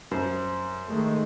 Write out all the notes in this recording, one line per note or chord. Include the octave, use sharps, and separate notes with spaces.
F#2 C5
D#3 G#3 A3